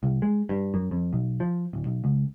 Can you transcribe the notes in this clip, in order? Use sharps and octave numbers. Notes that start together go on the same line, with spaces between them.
C2
G#3
G2
F#2
F2
B1
F3
D1
B1
C#2